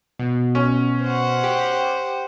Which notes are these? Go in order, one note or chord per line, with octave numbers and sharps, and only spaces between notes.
B2
C#4
C5 F#5
G4